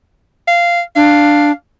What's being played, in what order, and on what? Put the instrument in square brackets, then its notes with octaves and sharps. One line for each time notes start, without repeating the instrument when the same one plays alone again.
[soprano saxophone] F5
[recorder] D4 [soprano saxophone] F5